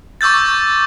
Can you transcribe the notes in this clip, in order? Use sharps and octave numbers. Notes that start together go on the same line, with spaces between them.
C#6 D6 E6 G6 A6